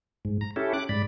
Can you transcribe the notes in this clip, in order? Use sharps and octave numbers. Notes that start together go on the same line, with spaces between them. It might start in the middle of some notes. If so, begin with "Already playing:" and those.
G#2
A#5
C#4 E4 G4 A4
D6 F#6
G#2 D5 B5